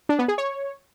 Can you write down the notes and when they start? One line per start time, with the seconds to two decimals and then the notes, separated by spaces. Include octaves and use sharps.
0.09 D4
0.19 B3
0.28 G#4
0.38 C#5